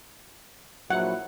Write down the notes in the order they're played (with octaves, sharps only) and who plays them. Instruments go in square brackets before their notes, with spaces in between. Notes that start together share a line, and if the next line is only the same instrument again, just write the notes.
[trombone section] A#1 F#3 E4 [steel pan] F#5